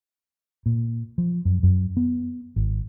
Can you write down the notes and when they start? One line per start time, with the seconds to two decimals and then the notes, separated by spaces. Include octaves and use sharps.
0.66 A#2
1.18 F3
1.45 F#2
1.63 F#2
1.97 B3
2.56 G#1